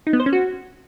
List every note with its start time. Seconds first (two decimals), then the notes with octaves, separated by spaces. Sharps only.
0.07 D#4
0.13 B3
0.20 C5
0.26 C#4
0.33 F#4